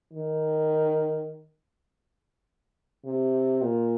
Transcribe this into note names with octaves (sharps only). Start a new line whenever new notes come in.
D#3
C3
A#2